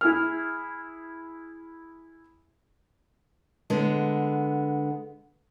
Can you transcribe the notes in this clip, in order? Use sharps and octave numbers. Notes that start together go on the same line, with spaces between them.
E4 G#4 F6
D3 G#3 B3